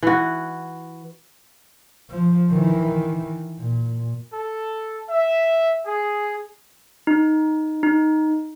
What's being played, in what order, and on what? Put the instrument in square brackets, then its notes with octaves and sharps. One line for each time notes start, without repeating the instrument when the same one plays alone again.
[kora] E3 F#4
[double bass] F3
D#3 E3
A#2
[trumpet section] A4
E5
G#4
[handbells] D#4
D#4